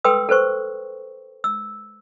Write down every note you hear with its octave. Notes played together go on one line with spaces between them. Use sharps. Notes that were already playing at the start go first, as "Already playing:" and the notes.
A4 B4 G5 C6 D#6 E6
A4 B4 C5 C#6
E6